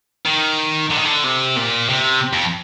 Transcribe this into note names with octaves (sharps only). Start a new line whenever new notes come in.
D#3
D3
D#3
D3
C3
A#2
C3
F2